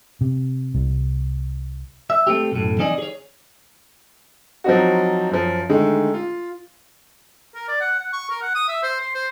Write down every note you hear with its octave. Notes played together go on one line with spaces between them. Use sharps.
C3
C2
E5
A3 C4 G4
B1 F#2 A2
E3 C4 D#4 G#4 D5 D#5
G#4 C#5
F3 F#3 C4 D#4 F#4
F#2 F3
D3 D#3 G#3 A3
F4
A#4
D5
F#5
F#5
C#6
A#4
F#5
D#6
E5
C5
C6
C5